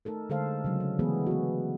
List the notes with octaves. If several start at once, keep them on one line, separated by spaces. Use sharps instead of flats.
A3 D#4 A4 A#4
D3 G#3 A4 C5 F5
C#3 F#3
D4
E3 G#3 A3 B3 G#4 B4
B3 F#4